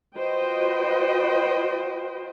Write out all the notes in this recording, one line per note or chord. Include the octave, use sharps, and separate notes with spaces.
F4 F#4 B4 C5 D#5 G5